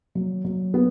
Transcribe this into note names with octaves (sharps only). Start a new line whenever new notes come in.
F#3
F#3
B3